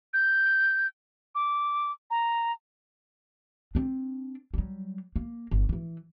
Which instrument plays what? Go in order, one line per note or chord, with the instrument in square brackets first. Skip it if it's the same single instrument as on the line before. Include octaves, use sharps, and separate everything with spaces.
[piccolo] G6
D6
A#5
[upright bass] C4 D4
F#3 G3
A#3
G1
D3 E3